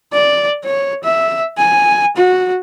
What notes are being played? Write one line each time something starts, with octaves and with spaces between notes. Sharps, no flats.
D5
C#5
E5
G#5
F#4